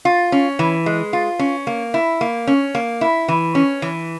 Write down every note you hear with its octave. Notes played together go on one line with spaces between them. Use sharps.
F4
C#4
E3
G#3
F4
C#4
A#3
E4
A#3
C#4
A#3
E4
E3
C#4
E3